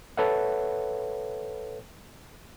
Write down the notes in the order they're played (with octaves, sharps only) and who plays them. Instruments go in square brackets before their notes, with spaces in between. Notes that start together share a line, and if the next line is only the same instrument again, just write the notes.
[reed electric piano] A4 B4 C#5 E5 F#5